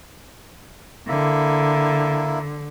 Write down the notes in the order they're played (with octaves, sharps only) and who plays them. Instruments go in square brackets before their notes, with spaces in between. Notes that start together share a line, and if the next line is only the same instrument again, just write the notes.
[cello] D3 [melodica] A#3 E4